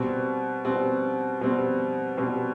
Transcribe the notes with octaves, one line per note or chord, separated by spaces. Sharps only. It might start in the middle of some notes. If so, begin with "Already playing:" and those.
Already playing: B2 G3 C4
B2 G3 C4
B2 G3 C4
B2 G3 C4